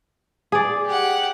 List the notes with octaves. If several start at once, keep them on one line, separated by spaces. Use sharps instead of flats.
G#4 D5
G4 F#5